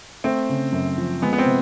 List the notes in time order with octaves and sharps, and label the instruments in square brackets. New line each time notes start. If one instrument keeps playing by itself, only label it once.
[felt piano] A3 [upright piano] C4
[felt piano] C#3
F#2
F3
[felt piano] G#3 [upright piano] B3
[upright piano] B3
C4
[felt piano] C3